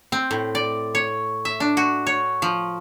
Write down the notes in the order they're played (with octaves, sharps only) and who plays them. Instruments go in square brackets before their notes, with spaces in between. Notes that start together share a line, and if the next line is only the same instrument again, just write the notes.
[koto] C4
A2
D5
C#5
E5
D4
F#4
C#5
F3